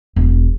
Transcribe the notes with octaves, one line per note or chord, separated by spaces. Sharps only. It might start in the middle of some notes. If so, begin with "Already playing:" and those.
E1